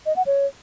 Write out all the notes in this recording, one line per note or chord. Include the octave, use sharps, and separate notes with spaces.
D#5
F#5
C#5